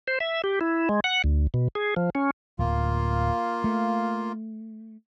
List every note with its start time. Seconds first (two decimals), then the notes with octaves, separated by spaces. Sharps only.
0.08 C5
0.20 E5
0.44 G4
0.61 E4
0.89 G#3
1.04 F#5
1.24 D2
1.54 B2
1.75 G#4
1.96 F3
2.15 C#4
2.59 D1 A#3 F4
3.64 A3